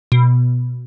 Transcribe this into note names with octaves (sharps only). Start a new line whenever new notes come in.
B2